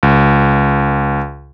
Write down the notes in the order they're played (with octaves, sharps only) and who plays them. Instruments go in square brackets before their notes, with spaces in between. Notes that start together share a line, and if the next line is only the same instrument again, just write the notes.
[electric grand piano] C#2